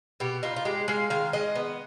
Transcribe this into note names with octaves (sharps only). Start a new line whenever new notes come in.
B2 G4
D#4 F4
F4
G#3 G4
G#3 F5
D#3 F5
G#3 D#5
B3